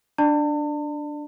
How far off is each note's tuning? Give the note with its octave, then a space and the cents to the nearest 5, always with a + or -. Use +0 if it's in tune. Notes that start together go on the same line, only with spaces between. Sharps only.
D4 +0 D5 +25 A5 +40